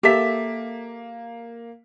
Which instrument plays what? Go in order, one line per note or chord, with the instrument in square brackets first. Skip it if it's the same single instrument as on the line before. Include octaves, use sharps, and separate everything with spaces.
[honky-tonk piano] A#3 B6 [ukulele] G4 A4 E5